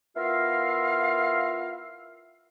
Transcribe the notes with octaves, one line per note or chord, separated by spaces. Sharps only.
B3 E4 F4 A#4 E5 F5